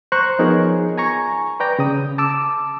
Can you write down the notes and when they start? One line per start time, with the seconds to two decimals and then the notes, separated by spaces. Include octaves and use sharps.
0.12 C5 A#5 C#6 F#6
0.39 F3 B3 D#4 G#4 A#4 C#5
0.98 G#5 A#5 C#6
1.60 B4 D5 G5 A#5
1.79 C#3 D#6
2.18 A5 D6 E6